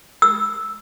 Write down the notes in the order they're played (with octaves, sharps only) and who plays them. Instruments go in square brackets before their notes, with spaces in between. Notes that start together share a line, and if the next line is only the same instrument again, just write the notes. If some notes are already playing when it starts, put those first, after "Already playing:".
[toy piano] E6